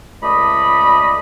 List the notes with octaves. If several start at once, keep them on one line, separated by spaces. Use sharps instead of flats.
C#2 A3 D5 D#5 B5